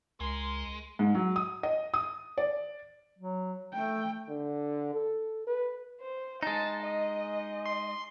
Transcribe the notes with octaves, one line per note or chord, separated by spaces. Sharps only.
C#2 G#3 A#4 G#5 C6
G#2
F#3
D#6
D#5
D#6
D5
F#3
A3 G5
D3
A4
B4
C5
G#3 D#4 A5
D#5
C6